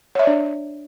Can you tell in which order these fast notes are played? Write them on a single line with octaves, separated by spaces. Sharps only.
C#5 E5 D5 D4